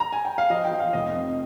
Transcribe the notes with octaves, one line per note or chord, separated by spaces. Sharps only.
A#5
G#5
G5
F5
F3 D#5
G5
F3
F5
F1 D#5
C3